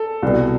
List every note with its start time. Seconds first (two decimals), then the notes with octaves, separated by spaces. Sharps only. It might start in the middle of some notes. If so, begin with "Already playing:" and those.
Already playing: A4
0.23 C2 B2